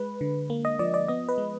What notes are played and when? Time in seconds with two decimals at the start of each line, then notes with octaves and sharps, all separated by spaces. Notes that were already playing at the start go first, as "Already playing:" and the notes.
Already playing: G#3 B4
0.21 D3
0.50 A#3
0.65 D#5
0.79 F3 D5
0.94 D5
1.08 B3 D#5
1.29 B4
1.38 G#3